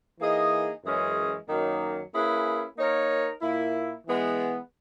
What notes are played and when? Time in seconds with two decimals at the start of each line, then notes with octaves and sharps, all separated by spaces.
0.19 E3 A#3 D#4 G#4 D#5
0.83 F#2 E3 G#3 C#4 G#4
1.48 F#2 D#3 F#3 A#3 D#4
2.12 A#3 C#4 E4 G#4 B4
2.77 A#3 D#4 A#4 C#5
3.41 A#2 A#3 E4
4.06 E3 G#3 B3